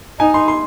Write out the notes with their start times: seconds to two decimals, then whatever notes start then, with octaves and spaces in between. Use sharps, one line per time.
0.20 D#4 G#5
0.34 C6
0.48 C6